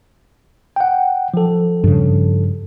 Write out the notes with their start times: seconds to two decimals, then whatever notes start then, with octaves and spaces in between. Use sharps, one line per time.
0.76 F#5 G5
1.34 F3 A4
1.84 G2 C#3